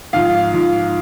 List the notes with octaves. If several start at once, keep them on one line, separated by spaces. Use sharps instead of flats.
G#2 F3 F5
G#2 F3